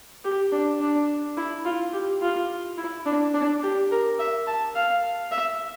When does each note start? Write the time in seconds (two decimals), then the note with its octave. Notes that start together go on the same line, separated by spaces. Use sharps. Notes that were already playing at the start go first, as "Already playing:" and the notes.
0.24 G4
0.52 D4
0.81 D4
1.37 E4
1.65 F4
1.93 G4
2.21 F4
2.78 E4
3.06 D4
3.34 D4
3.62 G4
3.91 A#4
4.19 E5
4.47 A5
4.75 F5
5.31 E5